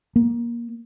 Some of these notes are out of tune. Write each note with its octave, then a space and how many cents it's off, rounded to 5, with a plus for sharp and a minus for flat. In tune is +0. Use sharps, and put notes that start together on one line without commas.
A#3 +15